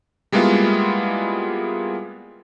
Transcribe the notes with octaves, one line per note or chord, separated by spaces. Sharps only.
G3 G#3 A#3 B3 E4 F4